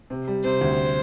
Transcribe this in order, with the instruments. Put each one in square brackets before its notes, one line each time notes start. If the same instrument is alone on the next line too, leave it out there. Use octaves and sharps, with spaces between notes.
[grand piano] C3
G3
[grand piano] C3 [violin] C5
[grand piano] D2